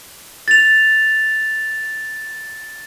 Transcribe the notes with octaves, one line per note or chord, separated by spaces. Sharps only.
A6 F7